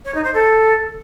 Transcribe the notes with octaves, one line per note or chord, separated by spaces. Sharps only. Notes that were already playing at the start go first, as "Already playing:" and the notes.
C#5
D#4
C5
A4